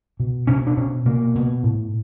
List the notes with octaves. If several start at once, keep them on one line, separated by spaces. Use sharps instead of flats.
B2
B2 C#4
D4
B2 C#4
B2 A#3
B2
A2